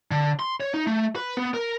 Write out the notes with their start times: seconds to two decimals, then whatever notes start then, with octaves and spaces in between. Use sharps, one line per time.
0.11 D3
0.39 C6
0.60 C#5
0.74 D#4
0.87 A3
1.16 B4
1.37 B3
1.54 A#4